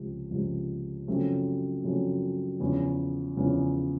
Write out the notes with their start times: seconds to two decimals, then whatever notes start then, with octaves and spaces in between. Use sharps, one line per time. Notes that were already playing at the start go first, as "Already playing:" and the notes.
Already playing: C#2 C3 F3
0.30 C#2 C3 F3
1.07 F#2 C#3 F3 A3 C4
1.84 F#2 C#3 F3 A3 C4
2.60 E2 C#3 F3
3.36 E2 C#3 F3